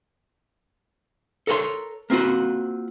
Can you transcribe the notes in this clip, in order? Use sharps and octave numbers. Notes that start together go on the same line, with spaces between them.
A4 A#4 C#5 G5 C6
A#3 C4 F4 F#4